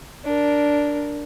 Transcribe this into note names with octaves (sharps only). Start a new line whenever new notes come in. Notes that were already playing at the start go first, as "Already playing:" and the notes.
D4 A#4